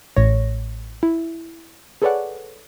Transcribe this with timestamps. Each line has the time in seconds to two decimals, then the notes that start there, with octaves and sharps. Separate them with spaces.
0.16 A1 A2 C#5 A#6
1.03 E4
2.02 G#4 A4 B4 C#5 D5 F#5